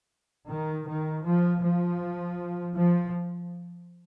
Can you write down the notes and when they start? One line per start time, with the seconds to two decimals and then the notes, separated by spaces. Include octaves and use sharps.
0.48 D#3
0.87 D#3
1.25 F3
1.62 F3
2.76 F3